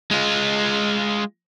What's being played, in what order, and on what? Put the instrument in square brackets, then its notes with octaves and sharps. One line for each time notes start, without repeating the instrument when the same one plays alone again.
[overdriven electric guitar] G#3 F4